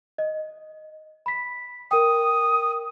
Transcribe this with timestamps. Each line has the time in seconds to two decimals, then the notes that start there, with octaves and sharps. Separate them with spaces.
0.18 D#5
1.26 B5 B6
1.91 A#4 G5 D#6